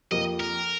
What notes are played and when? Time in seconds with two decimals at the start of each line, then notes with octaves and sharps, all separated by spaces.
0.11 F2 F3 A#3 G4 D#5
0.40 A#4